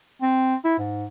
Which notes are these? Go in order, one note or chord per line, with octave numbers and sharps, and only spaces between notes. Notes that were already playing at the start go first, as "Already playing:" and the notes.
C4
E4
G#2